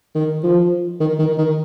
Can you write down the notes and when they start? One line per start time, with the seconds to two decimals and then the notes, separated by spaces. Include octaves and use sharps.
0.15 D#3
0.43 F3
1.00 D#3
1.19 D#3
1.38 D#3